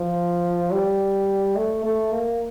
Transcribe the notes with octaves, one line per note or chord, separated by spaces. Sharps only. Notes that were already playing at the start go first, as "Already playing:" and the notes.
Already playing: F3
G3
A3
A3
A#3